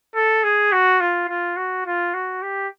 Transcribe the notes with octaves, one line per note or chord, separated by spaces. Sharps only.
A4
G#4
F#4
F4
F4
F#4
F4
F#4
G4